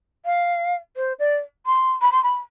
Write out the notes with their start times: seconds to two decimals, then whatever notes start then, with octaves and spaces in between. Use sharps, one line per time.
0.25 F5
0.97 C5
1.19 D5
1.66 C6
2.02 B5
2.12 C6
2.23 B5